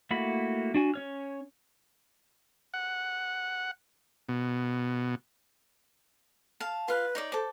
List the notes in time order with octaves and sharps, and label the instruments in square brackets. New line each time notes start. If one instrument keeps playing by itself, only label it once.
[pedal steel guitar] A3 A#3 E4 F#4 B5
D4 F#4 G#5
C#4 C#5 F6
[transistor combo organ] F#5
B2
[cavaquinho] F5 A5
[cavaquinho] F4 F5 [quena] B4
[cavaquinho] D#4 C#5 D5
[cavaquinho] A4 D6 [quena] C5